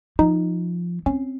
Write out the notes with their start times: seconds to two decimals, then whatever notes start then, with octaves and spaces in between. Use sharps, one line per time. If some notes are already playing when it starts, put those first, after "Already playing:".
0.19 F3 D#4
1.06 C4 C#4